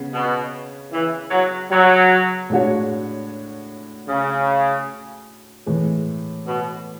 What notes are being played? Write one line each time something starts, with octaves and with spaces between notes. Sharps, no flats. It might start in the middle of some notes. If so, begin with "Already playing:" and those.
Already playing: C#3 B3
B2
E3
F#3
F#3
A2 G#3 D4 F#4 C#5
C#3
A2 E3 G#3
B2